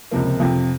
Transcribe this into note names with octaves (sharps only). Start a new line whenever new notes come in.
C#2 C3 F3 A#3
F2 C3 F3